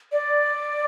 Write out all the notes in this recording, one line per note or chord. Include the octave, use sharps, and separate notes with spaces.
D5